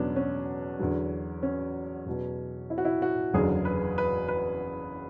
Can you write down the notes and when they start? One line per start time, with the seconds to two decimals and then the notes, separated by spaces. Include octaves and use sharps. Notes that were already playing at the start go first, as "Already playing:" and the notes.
Already playing: E2 B2 F#3 B3 C#4 D4
0.16 C#4
0.79 E2 D3 F#3
1.43 C#4
2.06 E2 B2 F#3
2.70 E4
2.78 F#4
2.85 E4
3.02 F#4
3.33 F#1 E2 D3 F#3 G#4
3.65 B4
3.98 B4
4.28 B4